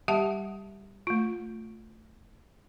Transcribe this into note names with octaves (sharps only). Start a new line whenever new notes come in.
G3 G4 E5 F#5 A5
A3 F4